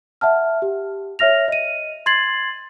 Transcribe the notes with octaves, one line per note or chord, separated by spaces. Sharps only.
E5 F#5 A5 F6
G4
C#5 E5 F6 A#6 F7
D#5 D#7
C6 G#6 A6 C7 F#7